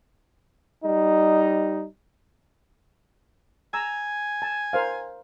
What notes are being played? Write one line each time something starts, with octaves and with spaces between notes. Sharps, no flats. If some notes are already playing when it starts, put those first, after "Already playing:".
G3 D#4
G#5 A#5 E6
A5
A#4 C5 F5